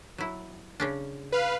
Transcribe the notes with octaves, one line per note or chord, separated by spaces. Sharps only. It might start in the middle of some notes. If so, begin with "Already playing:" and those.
F#3 E4
C#3 C#4 D4
B4 F5